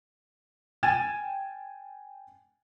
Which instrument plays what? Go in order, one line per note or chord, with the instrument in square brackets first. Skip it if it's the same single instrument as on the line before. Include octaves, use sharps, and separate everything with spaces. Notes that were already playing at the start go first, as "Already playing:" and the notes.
[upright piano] G5 G#5 G#6 A6 D#7 E7